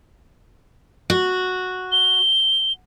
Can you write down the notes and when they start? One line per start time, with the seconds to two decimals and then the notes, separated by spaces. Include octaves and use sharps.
1.10 F#4
1.92 G7